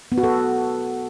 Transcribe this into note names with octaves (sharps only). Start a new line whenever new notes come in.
B3
F#4
A4